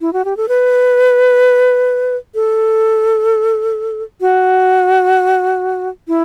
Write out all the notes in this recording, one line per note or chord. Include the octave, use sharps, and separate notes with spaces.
E4
F#4
G4
A4
B4
A4
F#4
E4